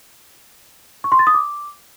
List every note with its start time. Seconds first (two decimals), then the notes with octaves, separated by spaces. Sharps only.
1.04 C#6
1.12 C6
1.19 A6
1.27 D#6
1.34 D6